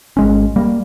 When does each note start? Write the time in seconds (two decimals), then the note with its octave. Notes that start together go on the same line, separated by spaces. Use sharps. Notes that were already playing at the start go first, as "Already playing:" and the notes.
0.17 G#1 G#3 C#4
0.56 G3 A#3